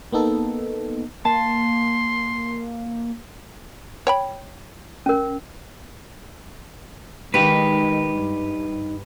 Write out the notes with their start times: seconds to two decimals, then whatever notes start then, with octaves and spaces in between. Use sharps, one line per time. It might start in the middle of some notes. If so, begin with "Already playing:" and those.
0.12 A#3 B3 D#4 A4
1.25 A#3 A5 C6
4.07 C#5 G5 B5
5.06 C#4 A#4
7.34 D#3 G#3 D#4 G4 B4
8.14 G2